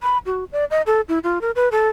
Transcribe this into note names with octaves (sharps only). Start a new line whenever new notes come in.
B5
F#4
D5
D#5
A4
E4
F4
A#4
B4
A4